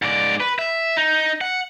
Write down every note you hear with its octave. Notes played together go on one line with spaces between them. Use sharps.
G#2 D5
B4
E5
D#4
F#5